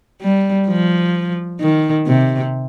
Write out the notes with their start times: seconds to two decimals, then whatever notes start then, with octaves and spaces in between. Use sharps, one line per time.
0.22 G3
0.68 F3
1.61 D#3
2.07 C3